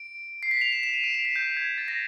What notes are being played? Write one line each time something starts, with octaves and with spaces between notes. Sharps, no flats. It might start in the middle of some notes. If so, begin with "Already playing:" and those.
Already playing: D7
C7
B6
F7
E7
E7
D#7
D7
F7
B6
G6
G#6
A6
A#6